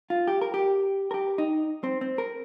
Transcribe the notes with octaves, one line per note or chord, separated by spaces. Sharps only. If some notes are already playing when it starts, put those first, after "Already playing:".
F4
G4
A#4
G4
A#4
G4
D#4
C4
C4
A#4